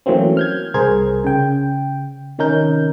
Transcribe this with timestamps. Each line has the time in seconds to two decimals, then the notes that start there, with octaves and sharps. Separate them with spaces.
0.06 E3 F#3 A3 A#3 C4 C#4
0.37 F6 G6 G#6
0.74 C2 G#4 A#4 C5 G#6
1.24 C#3 G5
2.38 C3 D#3 C#4 D#4 A#4 G6